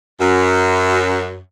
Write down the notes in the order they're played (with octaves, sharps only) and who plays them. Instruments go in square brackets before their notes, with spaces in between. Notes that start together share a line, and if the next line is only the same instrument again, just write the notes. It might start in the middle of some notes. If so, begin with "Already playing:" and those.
[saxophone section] F#2